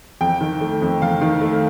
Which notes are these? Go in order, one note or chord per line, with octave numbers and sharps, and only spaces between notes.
F2 G5
D#3
A3
F2
F2 F5
D#3
A3